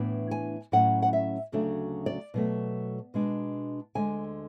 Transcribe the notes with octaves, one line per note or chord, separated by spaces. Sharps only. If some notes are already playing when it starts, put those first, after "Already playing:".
Already playing: A2 E3 B3 D4
G#5
A2 F#3 C#4 F#5
F#5
E5
D2 C#3 F#3 A3 D4
D5
B2 F#3 A3
B2 G#3 D4
D2 D3 G#3 G#5